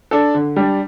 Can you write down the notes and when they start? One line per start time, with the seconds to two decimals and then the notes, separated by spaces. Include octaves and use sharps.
0.11 D4 A4
0.35 D3
0.56 G3 D4